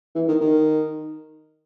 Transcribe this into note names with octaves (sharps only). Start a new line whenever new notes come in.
E3
D#3
D#3